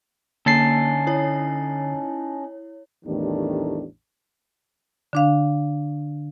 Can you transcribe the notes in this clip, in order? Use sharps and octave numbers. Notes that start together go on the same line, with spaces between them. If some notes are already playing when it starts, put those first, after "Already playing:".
D3 A#3 C#4 D#4 A4 A6 C7
E4 C#5
A1 E2 D#3 G3 A3 D4
D3 D4 F5